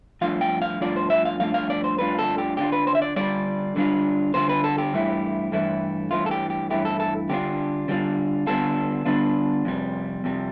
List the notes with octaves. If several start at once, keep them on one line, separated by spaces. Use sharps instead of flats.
G2 F3 A3 D4 F4 F5
G5
F5
G2 F3 A3 D4 F4 D5
C5
E5
F5
G2 F3 A3 D4 F4 F5
F5
D5
C5
G2 F3 A3 D4 F4 B4
A4
G4
D3 G3 D4 F4 G4
B4
C5
E5
D5
D3 G3 D4 F4 D5
D3 G3 D4 F4
D3 G3 D4 F4 C5
B4
A4
G4
G2 E3 A3 E4
G2 E3 A3 E4
G2 E3 A3 E4 F4
A4
G4
G4
G2 E3 A3 E4 G4
A4
A4
D3 G3 B3 D4 F4 G4
D3 G3 B3 D4 F4
D3 G3 B3 D4 F4 A4
D3 G3 B3 D4 F4
F2 C3 G3
F2 C3 G3